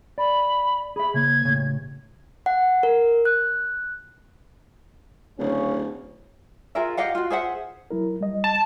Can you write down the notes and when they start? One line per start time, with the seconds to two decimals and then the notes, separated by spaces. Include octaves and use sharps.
0.18 D5 B5
0.96 G#4 E5 B5
1.14 C#3 A#3 G#6
1.45 A2 C#3
2.46 F#5
2.83 A#4
3.25 F#6
5.39 D1 C#3 C#4
6.75 F4 G#4 A#4 E5
6.97 G4 D#5 F5 F#5
7.15 F4 F#4
7.30 G#4 C5 E5 F#5
7.91 F#3 E4 A#4
8.21 G3 D#5
8.44 A5